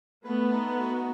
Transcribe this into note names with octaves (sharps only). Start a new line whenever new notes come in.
A3 B3 B4
D#4
F#4